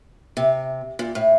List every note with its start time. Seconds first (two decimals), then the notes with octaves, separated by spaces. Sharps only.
0.37 C3
0.99 A#2
1.15 A2